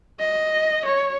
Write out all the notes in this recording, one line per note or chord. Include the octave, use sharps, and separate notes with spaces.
D#5
C#5